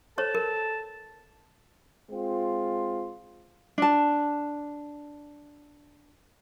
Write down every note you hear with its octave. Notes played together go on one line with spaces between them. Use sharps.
A4 C5 C#5 A5
A#4
G#3 C4 F4
D4 A5